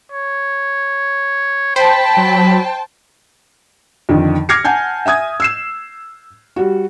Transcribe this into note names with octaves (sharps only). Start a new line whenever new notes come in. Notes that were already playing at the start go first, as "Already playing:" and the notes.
C#5
C5 G5 A5 B5
F#3
F2 D3 D#3
D6 F6 G#6 A#6 C7 C#7
F#5 G#5 A5 G6
E5 G#5 D#6 G#6
E6 C7 E7
G3 F#4